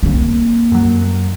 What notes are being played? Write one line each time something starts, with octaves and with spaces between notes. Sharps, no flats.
A#3 C4
F#2 F#3